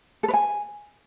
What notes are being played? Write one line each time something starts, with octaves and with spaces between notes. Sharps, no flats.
A4
B4
G#5